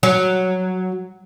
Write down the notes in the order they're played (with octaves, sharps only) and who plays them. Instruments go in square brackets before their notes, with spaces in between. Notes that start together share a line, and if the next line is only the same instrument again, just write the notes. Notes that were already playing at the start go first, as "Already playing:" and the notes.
[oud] F#3